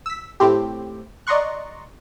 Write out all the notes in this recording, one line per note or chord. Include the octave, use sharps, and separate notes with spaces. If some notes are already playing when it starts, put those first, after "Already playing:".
E6 B6
A2 C4 G4
D5 D#5 A#5 C6 C#6 F#6